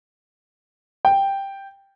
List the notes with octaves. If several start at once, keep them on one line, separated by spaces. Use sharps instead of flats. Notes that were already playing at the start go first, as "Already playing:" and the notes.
G5